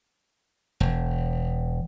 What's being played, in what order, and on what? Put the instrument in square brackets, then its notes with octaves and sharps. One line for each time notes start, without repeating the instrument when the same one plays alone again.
[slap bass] E1